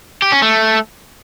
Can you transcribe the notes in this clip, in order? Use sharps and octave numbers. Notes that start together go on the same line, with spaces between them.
G4
C#4
A3